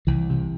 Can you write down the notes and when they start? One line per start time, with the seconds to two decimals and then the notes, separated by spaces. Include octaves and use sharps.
0.07 C2 E3
0.30 C3